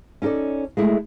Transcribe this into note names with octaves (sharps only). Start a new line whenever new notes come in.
C#4 D#4 G4 A4 D5
G#3 A3 E4